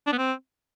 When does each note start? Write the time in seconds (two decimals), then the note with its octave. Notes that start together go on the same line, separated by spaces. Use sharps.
0.07 D4
0.13 B3
0.18 C4